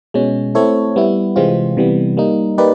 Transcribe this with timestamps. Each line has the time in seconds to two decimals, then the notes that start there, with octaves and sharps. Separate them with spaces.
0.14 B2 G#3 C#4
0.55 A3 C4 E4 A4 C#5
0.96 G3 B3 E4
1.36 C3 E3 G#3 C4 F4
1.77 C3 E3 G3 B3
2.17 G3 A#3 D#4
2.58 A#3 D#4 G4 B4 D5